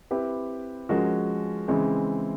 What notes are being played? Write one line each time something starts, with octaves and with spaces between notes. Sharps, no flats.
C4 E4 G4 B4
F3 G#3 C#4 F#4 A#4
C#3 E3 G#3 C4